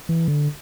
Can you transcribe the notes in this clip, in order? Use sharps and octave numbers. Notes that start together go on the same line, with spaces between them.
E3
D3